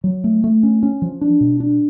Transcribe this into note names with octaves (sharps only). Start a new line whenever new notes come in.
F#3
A3
A3
C#4
C#4
F3
D4
B2
D4